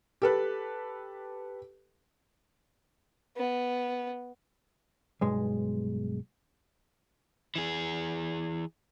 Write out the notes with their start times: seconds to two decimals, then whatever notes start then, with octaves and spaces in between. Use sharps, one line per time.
0.22 G4 A4 B4
3.37 B3
5.21 B1 G2 G#3
7.56 E3 G#4